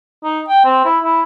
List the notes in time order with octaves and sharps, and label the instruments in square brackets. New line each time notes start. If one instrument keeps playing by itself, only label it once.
[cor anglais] D#4
G5
C4
E4
E4